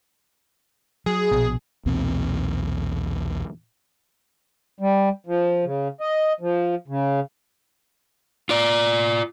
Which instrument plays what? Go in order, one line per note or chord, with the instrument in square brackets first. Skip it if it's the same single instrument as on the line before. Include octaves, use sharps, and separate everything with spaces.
[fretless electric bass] F#3 [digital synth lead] G#4
[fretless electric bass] A#1 B2
[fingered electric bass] B1 E2 A#2 C4
[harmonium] G3
F3
C#3
D#5
F3
C#3
[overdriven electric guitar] F4 D5